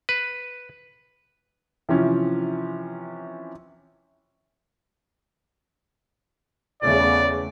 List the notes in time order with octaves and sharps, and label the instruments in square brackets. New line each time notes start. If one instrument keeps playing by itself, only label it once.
[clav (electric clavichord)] B4
[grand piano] C3 E3 F3 C#4
[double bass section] E2 C#3 A3 [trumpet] D5